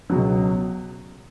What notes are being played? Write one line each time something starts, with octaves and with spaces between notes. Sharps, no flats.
C#2 B2 F#3